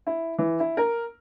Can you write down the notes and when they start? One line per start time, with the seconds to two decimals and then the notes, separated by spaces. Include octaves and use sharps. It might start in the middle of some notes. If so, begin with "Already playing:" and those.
0.07 E4
0.39 E3
0.60 E4
0.77 A#4